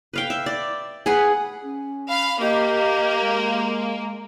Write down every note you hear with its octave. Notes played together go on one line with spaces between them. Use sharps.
B4 F5 G5
E5
D5
G#4 B4 F#5
C#4
F5 B5
A#3 G4 D#5
G#3